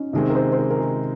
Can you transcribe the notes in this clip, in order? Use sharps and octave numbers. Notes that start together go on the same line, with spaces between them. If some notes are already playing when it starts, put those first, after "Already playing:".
Already playing: C#4 D#4
C3 D#3 G#3 C4 D#4
A#4
C5
C5
A#4
A#4
G#4